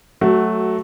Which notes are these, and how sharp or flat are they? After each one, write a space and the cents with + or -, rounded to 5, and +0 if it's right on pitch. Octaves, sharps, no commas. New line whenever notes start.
F#3 +10 A3 +0 F#4 +20